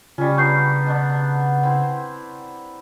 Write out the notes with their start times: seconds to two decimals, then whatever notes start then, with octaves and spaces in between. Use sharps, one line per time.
0.18 C#3 G3 C#4 F4
0.37 B3 D4 A#4 C#6 G6 C7
0.86 B2 D4 F#5
1.63 C4 E4